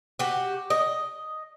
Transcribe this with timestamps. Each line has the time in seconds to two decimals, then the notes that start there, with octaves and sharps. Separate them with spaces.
0.19 F#4 G4
0.70 D#5